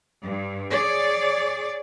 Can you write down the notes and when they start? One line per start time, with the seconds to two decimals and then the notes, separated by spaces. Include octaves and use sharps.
0.25 G2
0.72 G#4 C#5 D5